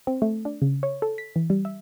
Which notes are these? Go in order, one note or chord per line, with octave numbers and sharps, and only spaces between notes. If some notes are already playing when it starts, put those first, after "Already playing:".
C4
A3
D4
C#3
C#5
A4
B6
E3
G3
E5